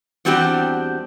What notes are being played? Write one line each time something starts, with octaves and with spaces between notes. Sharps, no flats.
E2 G3 C4 D4 F#4 G4